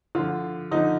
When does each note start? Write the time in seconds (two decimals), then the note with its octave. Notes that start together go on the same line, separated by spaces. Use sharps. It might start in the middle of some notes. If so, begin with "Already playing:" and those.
0.15 D3 F3 F4
0.71 D3 F3 D#4